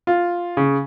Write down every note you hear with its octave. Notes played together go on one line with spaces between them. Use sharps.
F4
C#3